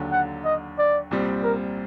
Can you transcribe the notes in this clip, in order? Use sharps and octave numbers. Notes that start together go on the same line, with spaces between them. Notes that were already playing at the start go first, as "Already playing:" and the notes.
Already playing: D#2 D3 F#3
F#5
D#5
D5
C2 A#2 G3 C4
A#4